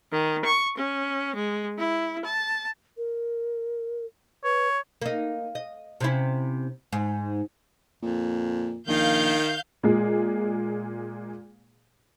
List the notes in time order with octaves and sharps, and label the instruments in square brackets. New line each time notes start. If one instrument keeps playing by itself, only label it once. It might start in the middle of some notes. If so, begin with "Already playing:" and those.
[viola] D#3
C#6
C#4
G#3
E4
A5
[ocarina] A#4
[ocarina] B4 [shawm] C#5
[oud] A#3 D#4
D#5
C3 C#4 E4
G#2
[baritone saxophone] F2 [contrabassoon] A#2
[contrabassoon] A#1 [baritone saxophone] D#3 [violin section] F5 G6
[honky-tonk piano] A#2 G#3 G#4